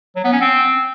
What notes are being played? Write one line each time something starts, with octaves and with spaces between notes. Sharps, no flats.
F#3
B3
C#4
C4